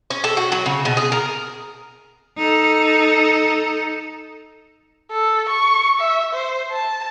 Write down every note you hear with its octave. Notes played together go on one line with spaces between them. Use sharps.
C#4
A4
F#4
F#3
C#3
B2
G#4
A#4
D#4 A4
A4
C#6
E5
C5
A5